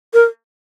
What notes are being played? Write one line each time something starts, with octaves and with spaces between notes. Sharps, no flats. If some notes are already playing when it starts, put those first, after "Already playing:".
A#4